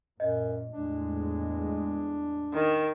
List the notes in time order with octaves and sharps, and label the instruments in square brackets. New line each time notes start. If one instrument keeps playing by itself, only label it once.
[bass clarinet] F#2 [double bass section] A#2 [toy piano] D#5
[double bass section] E2 A2 G#3 [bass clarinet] D4
[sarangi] D#3